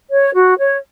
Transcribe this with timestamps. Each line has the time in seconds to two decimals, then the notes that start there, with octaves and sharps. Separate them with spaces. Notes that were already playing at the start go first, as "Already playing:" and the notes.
0.10 C#5
0.34 F#4
0.58 C#5